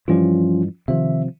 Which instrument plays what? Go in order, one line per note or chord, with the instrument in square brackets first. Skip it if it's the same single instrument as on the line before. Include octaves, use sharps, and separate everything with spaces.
[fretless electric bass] G2 E3 G3 [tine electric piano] F3 C#4 F4
[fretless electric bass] C3 F3 [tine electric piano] D#3 E5